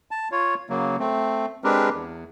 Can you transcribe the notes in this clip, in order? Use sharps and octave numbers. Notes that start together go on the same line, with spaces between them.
A5
F4 C#5
C#3 F#3 A#3
A3 C4
G#3 C4 D4 G4 A#4 B4
E2